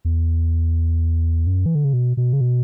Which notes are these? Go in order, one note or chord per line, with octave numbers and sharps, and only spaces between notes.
E2
F#2
E3
D3
C#3
B2
B2
C#3
B2